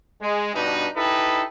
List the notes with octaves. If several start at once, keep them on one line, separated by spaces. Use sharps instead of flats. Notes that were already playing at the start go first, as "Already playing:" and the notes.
G#3
G2 B2 D4 D#4 B4
D#4 E4 G4 A4 B4